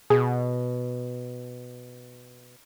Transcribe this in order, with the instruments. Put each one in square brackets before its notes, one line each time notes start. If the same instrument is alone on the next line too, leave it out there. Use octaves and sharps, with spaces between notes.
[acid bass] B2 [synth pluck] G#4